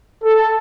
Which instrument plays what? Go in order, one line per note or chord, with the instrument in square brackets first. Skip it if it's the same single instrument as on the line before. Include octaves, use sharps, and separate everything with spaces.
[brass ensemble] A4